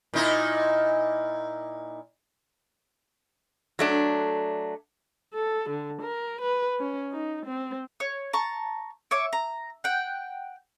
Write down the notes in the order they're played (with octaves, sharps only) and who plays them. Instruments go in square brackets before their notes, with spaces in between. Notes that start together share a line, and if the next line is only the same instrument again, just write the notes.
[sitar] A#2 D#4 E4
[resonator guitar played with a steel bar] F#3 A3 D4
[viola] A4
D3
A#4
B4
C#4
D#4
C4
[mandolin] C#5
A5 A#5 C#6
C#5 E5 D6
A#5
F#5 G5